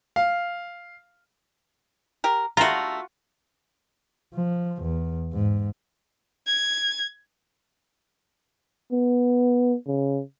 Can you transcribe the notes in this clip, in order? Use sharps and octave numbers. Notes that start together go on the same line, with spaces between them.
F5
G4 A#4
D3 G3 A3 F4 F#4 A#5
F3
E2
G#2
G#6
B3
C#3